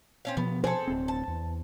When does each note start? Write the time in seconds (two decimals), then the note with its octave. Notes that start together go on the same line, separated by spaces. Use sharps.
0.25 C4 C#4 F5
0.37 B2 F3 B3
0.64 G#4 A4 C5
0.87 D1 C4
1.08 A5
1.28 E2